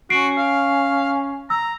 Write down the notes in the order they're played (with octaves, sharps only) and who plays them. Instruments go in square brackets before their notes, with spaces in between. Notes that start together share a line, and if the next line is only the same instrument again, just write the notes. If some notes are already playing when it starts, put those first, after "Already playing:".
[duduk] C#4 [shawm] F#4 [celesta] C7 D7
[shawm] F5
[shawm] A#5 [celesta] E6